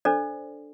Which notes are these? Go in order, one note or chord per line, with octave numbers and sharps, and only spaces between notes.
D4 A4 C5 D5